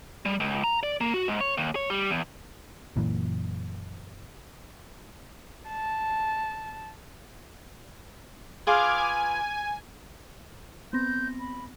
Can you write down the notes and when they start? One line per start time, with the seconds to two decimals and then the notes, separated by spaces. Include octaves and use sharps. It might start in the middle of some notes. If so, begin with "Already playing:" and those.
0.26 G3
0.40 C#2
0.64 A#5
0.83 D5
1.01 A#3
1.14 F#4
1.28 G#2
1.41 C#5
1.57 D#2
1.76 C#5
1.90 G3
2.10 E2
2.96 F#1 F#2 A#2 E3
5.67 A5
8.67 F4 G#4 B4 D6 F6 G#6
8.97 G#5
10.93 B3 C4 G6 A#6
11.39 B5